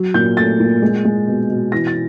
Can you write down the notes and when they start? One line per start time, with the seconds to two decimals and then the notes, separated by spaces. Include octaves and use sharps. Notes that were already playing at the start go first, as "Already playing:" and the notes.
Already playing: F#3
0.14 A#2 G6
0.37 A3 A6
0.60 A#2
0.82 G#3
1.05 G#3
1.27 B2
1.50 B2
1.72 E3 A#6
1.87 A6